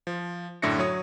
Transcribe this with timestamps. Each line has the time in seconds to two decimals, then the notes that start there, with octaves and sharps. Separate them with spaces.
0.07 F3
0.62 F#2 A2 D3 E5 A#6 C#7
0.79 F#3 C#5 D#6